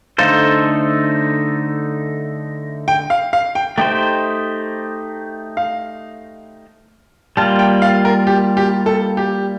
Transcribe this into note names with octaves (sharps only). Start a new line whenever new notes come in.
D3 A3 D#4 A4 C5 F5
G5
F5
F5
G5
A3 D#4 G4 C5 G5
F5
G3 A#3 F4 A5
G5
F5
A#4
G4
G4
A4
G4